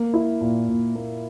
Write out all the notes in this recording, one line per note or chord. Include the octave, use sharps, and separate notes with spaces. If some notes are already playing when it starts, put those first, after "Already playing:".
Already playing: A#3
E4
A#2
A#2
A#3